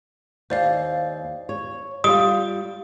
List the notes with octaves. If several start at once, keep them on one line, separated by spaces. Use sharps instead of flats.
D#2 C5 D5 F5
C#5
G3 F4 D#6 D7